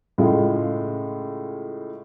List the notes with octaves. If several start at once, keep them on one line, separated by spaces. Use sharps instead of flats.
A2 C#3 G#3 F4